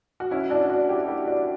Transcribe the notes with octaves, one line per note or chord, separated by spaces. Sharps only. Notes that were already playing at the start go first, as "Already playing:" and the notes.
F#4
C#4 E4
D4 F#4
D4 F#4
E4 G4
E4 G4
D4 F#4